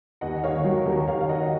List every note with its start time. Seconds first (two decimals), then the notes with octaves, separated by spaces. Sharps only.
0.21 D#2 D#5 F#5
0.43 D#3 C#5 F5
0.64 F#3 F#4 A#4
0.86 D#2 F#4 A#4
1.08 D#2 C#5 F5
1.21 F5
1.29 D#3 D#5 F#5